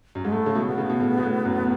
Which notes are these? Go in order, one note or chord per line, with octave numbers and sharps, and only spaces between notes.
F#2
G#2 G#3
A2 A3
C#3
B2
B3
C#3
B2
A2
B2
A2
F#2